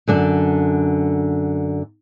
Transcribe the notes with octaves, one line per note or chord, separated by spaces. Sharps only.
F#2 D3 D4